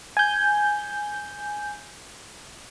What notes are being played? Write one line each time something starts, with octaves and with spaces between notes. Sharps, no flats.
G#5 G6